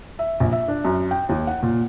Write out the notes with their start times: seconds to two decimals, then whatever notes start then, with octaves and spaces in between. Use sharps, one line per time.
0.19 E5
0.40 A#1
0.52 E5
0.68 D4
0.85 F#2
1.11 G5
1.29 D#2
1.47 F#5
1.62 A#2